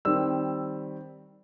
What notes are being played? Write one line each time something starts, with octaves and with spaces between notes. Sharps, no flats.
D#3 G3 C4 E6